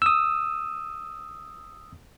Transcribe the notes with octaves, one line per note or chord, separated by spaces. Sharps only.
D#6 E6